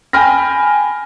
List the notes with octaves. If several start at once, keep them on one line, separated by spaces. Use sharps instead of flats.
G5 G#5 B5 F6 A#6